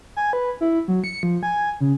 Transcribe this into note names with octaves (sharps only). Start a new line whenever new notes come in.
G#5
B4
E4
F#3
C#7
F3
G#5
C#3